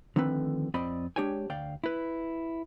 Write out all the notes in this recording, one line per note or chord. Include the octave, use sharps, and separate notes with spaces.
D3 D#3 F3 A3 C4 B4
F2 C4 D5 D#5 B5
G#3 D4 G4 C#5 G5 G#5
D2 D5 F5 G5
E4 B4